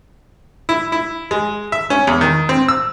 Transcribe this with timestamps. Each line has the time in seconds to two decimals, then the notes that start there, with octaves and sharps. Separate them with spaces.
0.69 E4
0.92 E4
1.31 G#3
1.72 E5
1.90 C#4
2.07 E2
2.21 D#3
2.49 C4
2.68 E6